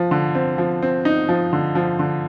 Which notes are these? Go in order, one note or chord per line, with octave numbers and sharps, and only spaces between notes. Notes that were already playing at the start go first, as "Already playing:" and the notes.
Already playing: F3
D3
C4
F3
C4
D#4
F3
D3
F3
D3